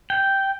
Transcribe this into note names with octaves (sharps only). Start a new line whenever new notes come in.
G5